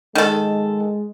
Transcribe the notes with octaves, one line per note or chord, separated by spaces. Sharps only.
D#3 G#3 A4